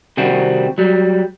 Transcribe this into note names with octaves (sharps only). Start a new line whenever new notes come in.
C3 D#3 G3 C4 F#4
F#3 G3